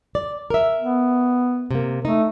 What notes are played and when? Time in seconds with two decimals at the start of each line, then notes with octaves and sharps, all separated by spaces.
0.15 D5
0.50 A#4 E5
0.79 B3
1.71 C3 A#3
2.05 A3 D#4